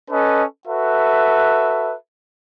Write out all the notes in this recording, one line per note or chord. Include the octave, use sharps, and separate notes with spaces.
C#4 A4 B4 D#5
F#4 A4 B4 E5